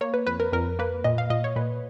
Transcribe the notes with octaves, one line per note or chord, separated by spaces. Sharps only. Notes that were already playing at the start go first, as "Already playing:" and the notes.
A#3 C#5
B4
F2 B4
A#4
F2 A#4
A#3 B4
A#2 D#5
F5
A#2 D#5
C#5
A#2 B4